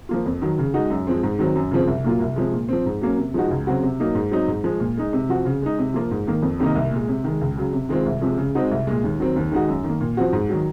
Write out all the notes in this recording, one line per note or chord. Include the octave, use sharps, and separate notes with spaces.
F3 A#3 F4
F2
D#3 F#3
C#3
G#3 D#4 F#4
F#2
F3 G#3 C4
G#2
D#3 F#3 C4
F#2
C#3 F3 C4
C2
A#2 F#3 A#3 F4
C2
C3 F3 G#3
A#2
F3 C4
G#2
F#3 A#3 C#4
C3
F3 G#3 D#4 F#4
C#2
C#3 F#3 C4 F#4
C3
F#3 A#3 D#4
G#2
F#3 C4 D#4
G#2
F3 G#3
A#2
G#3 D#4
C3
F3 C4 F#4
C#3
G#3 D#4
C3
F3 A#3 F4
G#2
D#3 A#3
F2
C3 D#3 A#3 D#4
C2
A#2 G#3
C3
D#3 G#3
C#2
C#3 F#3
C3
D#3 G#3 C4 F4
C2
C3 F3 G#3
C#3
G#3 C4 D#4 F#4
C2
A#2 G#3
D#2
D#3 F#3 C4
D#2
D#3 G#3 D#4 F#4
F#2
D#3
A#3
A#2
F3 C4 F#4
G#2
D#3 F#3